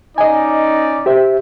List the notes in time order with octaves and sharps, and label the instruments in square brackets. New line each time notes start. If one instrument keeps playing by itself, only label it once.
[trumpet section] C#4 D#4 D5 [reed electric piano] D#5 G#5
[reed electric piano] G4 C5 E5